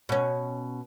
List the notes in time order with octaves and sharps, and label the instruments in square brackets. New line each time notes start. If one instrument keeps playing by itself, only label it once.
[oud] B2 C#4